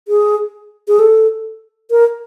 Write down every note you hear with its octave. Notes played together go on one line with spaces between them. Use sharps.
G#4
G#4
A4
A#4